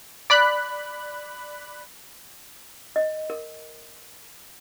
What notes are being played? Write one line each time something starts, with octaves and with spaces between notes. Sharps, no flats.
D5 B5 F#6
D#5
A#4